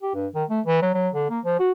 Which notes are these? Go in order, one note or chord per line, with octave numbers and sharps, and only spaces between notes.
G4
G2
D#3
A3
E3
F#3
F#3
D3
A#3
F3
F#4